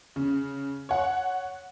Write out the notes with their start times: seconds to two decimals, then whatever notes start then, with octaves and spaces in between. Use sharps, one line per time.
0.16 C#3
0.89 C#5 F#5